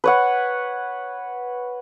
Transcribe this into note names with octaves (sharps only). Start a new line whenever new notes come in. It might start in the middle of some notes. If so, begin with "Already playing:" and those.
B4 C#5 F#5